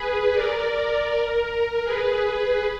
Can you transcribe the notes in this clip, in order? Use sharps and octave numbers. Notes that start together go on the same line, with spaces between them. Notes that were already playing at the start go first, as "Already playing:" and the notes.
Already playing: G#4 B4
A#4 D5
A#4
G#4 B4